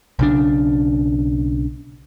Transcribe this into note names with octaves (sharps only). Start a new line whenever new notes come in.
B1 C#3 D4